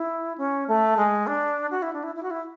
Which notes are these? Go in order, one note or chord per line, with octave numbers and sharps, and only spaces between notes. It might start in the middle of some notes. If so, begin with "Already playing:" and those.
Already playing: E4
C#4
A3
G#3
D4
F#4
E4
D4
E4
E4
F#4
E4